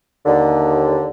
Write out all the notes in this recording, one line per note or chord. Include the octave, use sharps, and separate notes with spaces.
D#2 D3